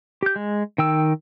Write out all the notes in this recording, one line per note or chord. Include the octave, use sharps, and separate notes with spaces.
G4 G6
G#3
D#3 G5 E6